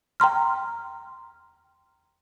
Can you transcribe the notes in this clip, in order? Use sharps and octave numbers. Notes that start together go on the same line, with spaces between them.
G5 A#5 C6 F6